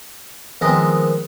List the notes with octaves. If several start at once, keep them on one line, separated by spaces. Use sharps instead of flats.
D#3 F3 G#3 B3 C4 D#4